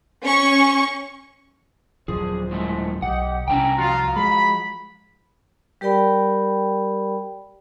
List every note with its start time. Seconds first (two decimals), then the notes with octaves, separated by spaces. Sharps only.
0.24 C#4 C#6
2.08 D#1 F#2 F3 D4 G#4 C5
2.51 A2 G#3 A3
3.02 B1 G4 D#5 F#5
3.48 C2 C#4 D4 G5 A#5
3.79 F3 F4 F#4
4.16 G#3 B5
5.81 G3 G4 A#4 D5 G5 B5